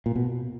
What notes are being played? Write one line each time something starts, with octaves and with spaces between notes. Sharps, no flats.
A#2
B2